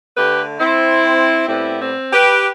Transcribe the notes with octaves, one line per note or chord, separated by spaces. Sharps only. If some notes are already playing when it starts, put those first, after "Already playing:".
D3 A3 G4 B4
C4 E4
A2 G3 B3 C4 E4
C4
G4 B4